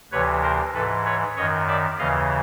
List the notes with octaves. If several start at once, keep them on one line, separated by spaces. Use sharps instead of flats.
D2 C3 E3 B4 C#5
A#4 C5
G#2 E3 A4 B4
B4 C#5
F#2 D#3 C#5 D#5
D5 E5
D#2 C#3 E3 D#5 F5